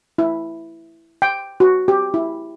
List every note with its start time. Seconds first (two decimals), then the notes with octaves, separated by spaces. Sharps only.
0.18 E4
1.22 G5
1.60 F#4
1.88 G4
2.14 E4